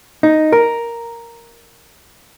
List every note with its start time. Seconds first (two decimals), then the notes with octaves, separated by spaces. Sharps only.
0.23 D#4
0.52 A#4